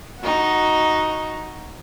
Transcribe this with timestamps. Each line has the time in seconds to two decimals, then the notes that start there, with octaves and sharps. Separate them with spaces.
0.20 D#4 F#4